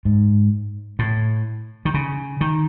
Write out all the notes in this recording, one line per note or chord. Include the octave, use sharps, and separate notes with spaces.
G#2
A2
D#3
C#3
D#3